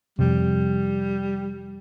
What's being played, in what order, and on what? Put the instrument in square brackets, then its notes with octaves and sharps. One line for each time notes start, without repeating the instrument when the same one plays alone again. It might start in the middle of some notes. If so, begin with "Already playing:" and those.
[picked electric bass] F2 C3 [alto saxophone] G3